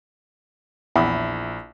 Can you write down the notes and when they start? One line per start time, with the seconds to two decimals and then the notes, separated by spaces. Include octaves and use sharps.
0.96 A#1 E2 E4 B5